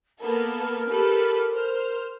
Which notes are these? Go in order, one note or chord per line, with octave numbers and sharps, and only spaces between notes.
A#3 B3 A4 A#4
G4 A4 B4
C5 F6